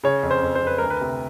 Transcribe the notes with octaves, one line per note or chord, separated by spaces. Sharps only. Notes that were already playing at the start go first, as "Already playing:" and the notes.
C#3 C#5
F2
C5
F2
C5
F2 B4
D2 A#4
B4
C3